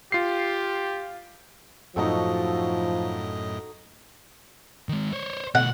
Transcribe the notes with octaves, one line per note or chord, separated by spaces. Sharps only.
F4 G4 C7
F#2 A2 F3 D#4 F#4 A4 D#5
D#3 G#3
C5 C#5
B2 A3 F#5